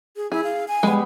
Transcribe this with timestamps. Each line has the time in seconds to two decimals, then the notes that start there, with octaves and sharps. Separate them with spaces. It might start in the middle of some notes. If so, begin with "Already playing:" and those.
0.16 G#4
0.32 E4 G#4
0.44 F5
0.68 G#5
0.83 G3 G#3 B3